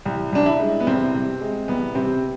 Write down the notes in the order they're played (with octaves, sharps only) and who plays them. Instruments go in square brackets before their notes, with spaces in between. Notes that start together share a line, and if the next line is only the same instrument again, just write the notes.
[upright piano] C2
C2 D4
E4
G#3
B3
C2 C4
C3
G#3
C2 B3
C3 C4